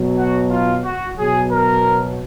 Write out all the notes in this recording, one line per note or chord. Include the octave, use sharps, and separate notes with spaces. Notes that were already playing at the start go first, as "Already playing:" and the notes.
Already playing: B2 F#3
F#4
F4
F#4
B2 F#3 G#4
A#4